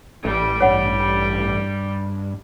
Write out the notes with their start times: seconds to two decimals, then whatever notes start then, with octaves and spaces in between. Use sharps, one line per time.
0.25 A1 G3
0.61 G2 C#5 F#5